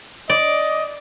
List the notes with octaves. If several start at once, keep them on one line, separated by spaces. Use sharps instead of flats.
D5 D#5